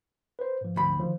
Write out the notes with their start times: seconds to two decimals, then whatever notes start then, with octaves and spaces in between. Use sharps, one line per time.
0.39 B4 C5
0.61 G#2 F3
0.76 D2 B5
0.99 D#3 F3